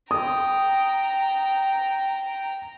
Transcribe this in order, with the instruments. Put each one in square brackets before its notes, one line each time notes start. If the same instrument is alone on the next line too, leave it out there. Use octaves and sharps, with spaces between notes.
[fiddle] G5 A#5 [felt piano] D#6